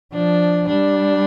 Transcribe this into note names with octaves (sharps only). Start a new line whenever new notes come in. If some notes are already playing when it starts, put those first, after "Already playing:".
F3 D4
G3 D4